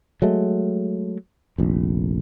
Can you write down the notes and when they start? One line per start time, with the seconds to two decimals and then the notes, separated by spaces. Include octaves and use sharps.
0.22 F#3 G#3 A3
1.58 F1 A#1